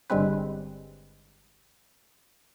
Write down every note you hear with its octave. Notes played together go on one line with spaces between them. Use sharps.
G1 G2 G3 G#3 C4 B4